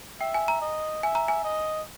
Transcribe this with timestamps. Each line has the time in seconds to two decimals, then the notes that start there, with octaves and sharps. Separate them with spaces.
0.20 E5 G5
0.34 G#5
0.48 A#5
0.61 D#5
1.03 E5 G#5
1.15 A#5
1.28 G#5
1.44 D#5